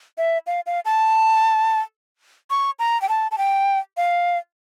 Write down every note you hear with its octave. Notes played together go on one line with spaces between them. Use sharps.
E5
F5
F5
A5
C#6
A#5
G5
A5
A5
G5
F5